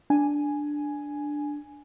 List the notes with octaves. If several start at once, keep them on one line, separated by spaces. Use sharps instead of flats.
D4 G#5